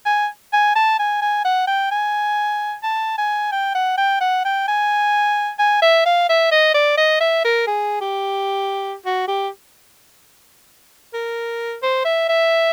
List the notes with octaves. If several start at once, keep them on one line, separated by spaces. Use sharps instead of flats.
G#5
G#5
A5
G#5
G#5
F#5
G5
G#5
A5
G#5
G5
F#5
G5
F#5
G5
G#5
G#5
E5
F5
E5
D#5
D5
D#5
E5
A#4
G#4
G4
F#4
G4
A#4
C5
E5
E5